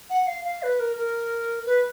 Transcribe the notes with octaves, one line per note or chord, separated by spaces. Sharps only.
F#5
F5
F5
B4
A#4
A#4
B4